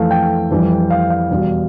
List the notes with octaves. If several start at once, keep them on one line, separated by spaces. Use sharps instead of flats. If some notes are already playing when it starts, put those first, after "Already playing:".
Already playing: F2 E3 A3 F5
G5
F2 E3 G3
F5
F5
E2 B2 G3